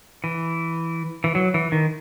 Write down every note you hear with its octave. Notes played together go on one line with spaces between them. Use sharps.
E3
E3
F#3
E3
D#3